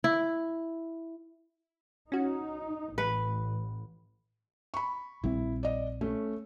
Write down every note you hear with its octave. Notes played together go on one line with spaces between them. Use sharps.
E4
C#4 D#4 F#4
A1 B4
B5 C#6
A#1 G3 C4 E4
D5 D#5
A3 C#4